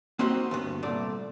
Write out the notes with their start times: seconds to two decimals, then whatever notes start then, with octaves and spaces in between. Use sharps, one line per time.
0.19 A#3 C4 D#4 F#4 G4
0.51 D2 G2 B3
0.83 C2 A#2 A3 D5